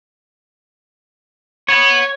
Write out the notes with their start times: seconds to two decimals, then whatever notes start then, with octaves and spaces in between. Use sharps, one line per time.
1.69 C#5 F#5 B5